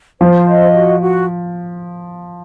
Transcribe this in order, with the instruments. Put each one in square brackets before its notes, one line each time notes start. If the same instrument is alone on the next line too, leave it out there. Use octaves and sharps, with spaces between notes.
[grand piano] F3 [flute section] C5
[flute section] D#5
F#4
F#4